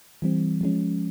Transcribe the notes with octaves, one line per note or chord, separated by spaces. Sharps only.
E3 G3 C4
F3 G#3 C#4